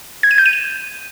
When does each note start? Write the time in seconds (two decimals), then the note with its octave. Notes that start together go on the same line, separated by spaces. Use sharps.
0.23 G#6
0.31 D#7
0.38 G6
0.46 D#7
0.53 E7